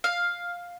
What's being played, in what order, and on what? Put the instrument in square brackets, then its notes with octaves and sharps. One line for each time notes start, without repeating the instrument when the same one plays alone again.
[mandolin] F5